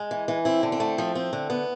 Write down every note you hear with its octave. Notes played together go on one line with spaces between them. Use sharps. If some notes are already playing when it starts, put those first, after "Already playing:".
Already playing: G#3
E3
E3
C4 E4
D3
C4
A3
F3
C4
D3
B3